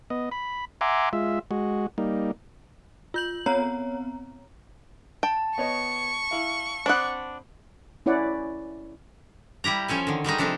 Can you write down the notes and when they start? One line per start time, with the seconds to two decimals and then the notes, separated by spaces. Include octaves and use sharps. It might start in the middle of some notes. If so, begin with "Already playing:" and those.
0.10 B3 D#5
0.32 B5
0.81 E5 F#5 G#5 A#5 C6 D6
1.13 G#3 F4 E5
1.51 G#3 F#4
1.98 G3 A#3 D#4
3.14 F4 G6 F#7
3.46 B3 C4 C#5 A#5
5.23 G5 A5
5.58 B3 C#5 D#5 C#6
6.31 E4 F5
6.86 C4 D4 F#5 B5 D#6
8.06 C#4 E4 C#5 D5 F#5
9.64 G3 E4 G4 A#5
9.88 F3 C#4 A4 G#5
10.07 D3 D#3
10.24 D#3 G3 G#3 D#4
10.38 C3 F3 D4 D#4 A4